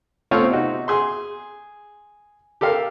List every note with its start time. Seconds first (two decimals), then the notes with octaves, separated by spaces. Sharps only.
0.31 A3 B3 C4 F4 C#5 F5
0.49 C3 D#4 F#4
0.88 G#4 C6
2.61 G4 A4 A#4 F5